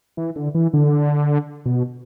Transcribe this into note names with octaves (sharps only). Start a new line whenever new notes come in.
E3
D3
E3
D3
B2